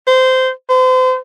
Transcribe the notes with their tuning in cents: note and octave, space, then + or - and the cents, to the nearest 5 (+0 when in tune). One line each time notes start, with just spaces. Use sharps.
C5 -15
C5 -35